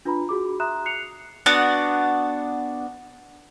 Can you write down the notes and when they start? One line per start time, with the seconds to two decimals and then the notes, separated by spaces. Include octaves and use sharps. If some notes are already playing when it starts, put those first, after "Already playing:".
0.05 D4 F4 B4 A#5 B5
0.29 F#4 G#4 D6
0.60 E5 A#5 C6 D#6 F#6 E7
0.86 F#6 C7 C#7 F7
1.46 B3 D4 F#4 F#5